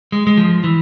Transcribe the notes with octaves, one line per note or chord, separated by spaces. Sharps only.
G#3
G#3
F3
E3